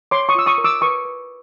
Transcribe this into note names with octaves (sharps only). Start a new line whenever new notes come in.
C#5 C6 D6
C#6 D#6
F4 E6
C#6 D#6
A#4
D6 E6
B4 C#6 D#6
B4